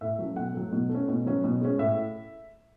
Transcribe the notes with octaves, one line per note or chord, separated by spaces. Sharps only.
A2 E5
F#3 A3 C#4
B2 F#5
F#3 A3
B2
A3
C#4
B2
F#3 C#4
B2
G#3 C#4
A2 E5